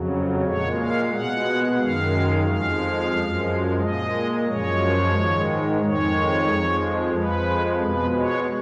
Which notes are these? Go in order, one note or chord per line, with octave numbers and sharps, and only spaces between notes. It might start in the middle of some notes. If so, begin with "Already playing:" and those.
Already playing: F2 C#3 F#3
A#2 G#3 C#5
F5
B2 G#3 F#5
F#2 D#3 G#3 F5
F2 F3 G#3 F5
F#2 F3 G#3
A#2 G#3 D#5
F#2 F3 G#3 C#5
G#2 D#3 G#3
F2 D#3 G#3 C#5
F2 F3 G#3
F2 F3 G#3 B4
B2 G#3 B4
C#5